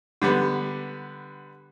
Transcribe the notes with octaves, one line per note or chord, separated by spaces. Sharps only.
D3 G3 B3